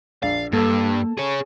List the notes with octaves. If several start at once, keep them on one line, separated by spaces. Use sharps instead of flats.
A#1 D5 F5
G2 A#3 A4 E6
G#4 C#5